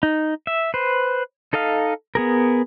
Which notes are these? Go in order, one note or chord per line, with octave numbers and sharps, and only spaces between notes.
D#4
E5
B4 C5
D#4 A4 D#5 F5
B3 G#4 A#4